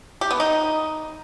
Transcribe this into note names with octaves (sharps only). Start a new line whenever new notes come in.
G4
B3
D#4